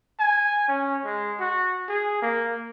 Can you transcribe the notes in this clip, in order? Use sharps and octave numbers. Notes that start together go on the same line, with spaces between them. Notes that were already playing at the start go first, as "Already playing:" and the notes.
G#5
C#4
G#3
F#4
G#4
A#3